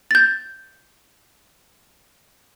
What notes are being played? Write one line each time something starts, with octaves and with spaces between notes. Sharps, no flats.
G6 A6